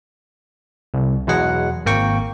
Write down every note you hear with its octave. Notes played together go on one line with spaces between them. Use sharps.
C2
E2 B2 F#3 G#3 F#5
G#1 A#3 G5 C#6